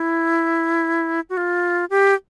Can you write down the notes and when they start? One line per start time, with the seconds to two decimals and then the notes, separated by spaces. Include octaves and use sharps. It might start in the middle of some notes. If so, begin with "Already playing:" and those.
Already playing: E4
1.30 F#4
1.37 F4
1.90 G4